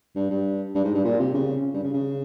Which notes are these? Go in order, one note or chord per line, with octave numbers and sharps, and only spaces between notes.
G2
G2
G2
G#2
G2
A#2
C3
C#3
G2
C#3
C#3